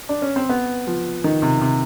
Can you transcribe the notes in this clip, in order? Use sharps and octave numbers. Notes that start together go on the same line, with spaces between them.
D4
C#4
C4
B3
F3
D#3
C3
C3